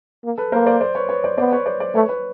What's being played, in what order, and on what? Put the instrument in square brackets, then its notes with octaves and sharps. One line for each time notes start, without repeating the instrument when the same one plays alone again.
[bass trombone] A#3
[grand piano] A4 B4
[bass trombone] A#3 [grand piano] A#4 C5
[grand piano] C5 D5
C5 D5
B4 C#5
B4 C#5
C5 D5
[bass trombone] B3 [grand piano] C5 D5
[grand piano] B4 C#5
C5 D5
C5 D5
[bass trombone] A3 [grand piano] B4 C#5
[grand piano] B4 C#5